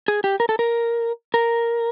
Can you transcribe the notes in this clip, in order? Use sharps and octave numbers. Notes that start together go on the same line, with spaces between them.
G#4
G4
A#4
A4
A#4
A#4